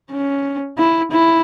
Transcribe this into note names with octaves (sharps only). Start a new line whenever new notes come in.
C#4
E4
E4